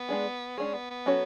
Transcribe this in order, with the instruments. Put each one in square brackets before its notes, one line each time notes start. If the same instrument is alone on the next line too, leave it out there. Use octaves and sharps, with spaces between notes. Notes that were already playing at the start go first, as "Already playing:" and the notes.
Already playing: [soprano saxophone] B3
[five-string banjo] G#3 D4 G#4
[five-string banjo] G#3 D4 G#4 [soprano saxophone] C#4
[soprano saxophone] B3
B3
[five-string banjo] F#3 C#4 F#4 A4 C#5